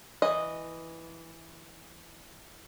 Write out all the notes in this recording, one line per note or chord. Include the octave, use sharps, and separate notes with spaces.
E3 D#5